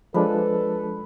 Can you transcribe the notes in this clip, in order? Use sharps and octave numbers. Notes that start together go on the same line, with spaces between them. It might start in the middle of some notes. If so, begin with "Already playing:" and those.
F3 G#3 D4 A4 B4